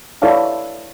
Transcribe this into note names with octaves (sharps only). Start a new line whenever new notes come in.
E4 A4 C#5 D5 F5 A5